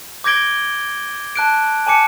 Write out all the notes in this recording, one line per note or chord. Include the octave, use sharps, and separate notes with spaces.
D6 G6 G#6 A#6 D7 G7
A5 F#6 D7
G#5 A5 D6 C#7